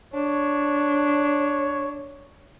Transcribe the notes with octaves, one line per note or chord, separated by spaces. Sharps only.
D4 C#5